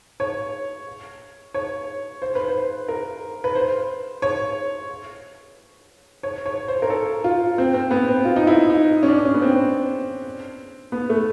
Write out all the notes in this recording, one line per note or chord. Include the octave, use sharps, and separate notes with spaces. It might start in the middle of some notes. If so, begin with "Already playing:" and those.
C#5
C#5
C5
B4
C5
A#4
B4
C5
C#5
C#5
C#5
C5
A#4
A4
F4
C4
C4
B3
C4
F4
D#4
E4
D#4
C#4
D4
C#4
B3
C4
B3
A3